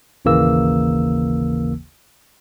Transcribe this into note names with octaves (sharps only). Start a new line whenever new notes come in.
G#1 D#2 C#3 E3 A#3 E6